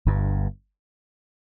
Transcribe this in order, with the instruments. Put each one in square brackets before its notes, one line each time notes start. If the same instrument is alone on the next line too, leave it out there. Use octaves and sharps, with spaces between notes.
[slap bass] G1 G2